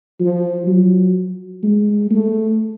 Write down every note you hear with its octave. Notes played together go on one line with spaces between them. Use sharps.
F3
F#3
G#3
A3